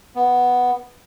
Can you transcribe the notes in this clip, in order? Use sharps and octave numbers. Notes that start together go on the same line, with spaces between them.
B3